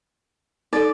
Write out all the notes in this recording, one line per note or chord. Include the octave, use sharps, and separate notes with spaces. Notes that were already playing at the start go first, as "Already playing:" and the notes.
D#4 A4 D5